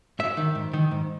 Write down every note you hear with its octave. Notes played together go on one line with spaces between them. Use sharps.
G#2 E5
D#3
G#2
D#3
G#2